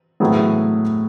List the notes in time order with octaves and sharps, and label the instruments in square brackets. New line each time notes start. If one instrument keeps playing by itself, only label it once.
[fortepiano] A2 F#3 B3 E4 G#4